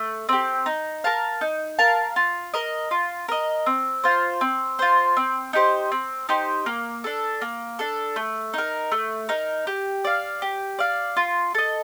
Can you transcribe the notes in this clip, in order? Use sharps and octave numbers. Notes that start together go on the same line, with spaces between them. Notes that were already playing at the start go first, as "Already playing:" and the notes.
Already playing: A3
C4 G4
D#4
A#4 F5 A5
D#4
A#4 F5 A5
F4
A#4 D#5
F4
A#4 D#5
C4
F4 C5
C4
F4 C5
C4
D#4 G4 C5
C4
D#4 G4 C5
A#3
D4 A4
A#3
D4 A4
A3
D#4 A#4
A3
D#4 A#4
G4
D5 F5
G4
D5 F5
F4
A4 D#5